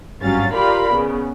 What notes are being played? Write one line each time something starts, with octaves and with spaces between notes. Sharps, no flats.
G#1 G2 F#3 C#4 F5 A6
F4 G4 A#4 D5 F5 B5
C#3 B3